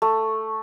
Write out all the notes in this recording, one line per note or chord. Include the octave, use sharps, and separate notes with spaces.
A3